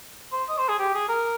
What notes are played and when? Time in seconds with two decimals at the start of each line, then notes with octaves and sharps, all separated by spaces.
0.32 C5
0.49 D#5
0.58 C5
0.69 G#4
0.79 G4
0.94 G#4
1.09 A#4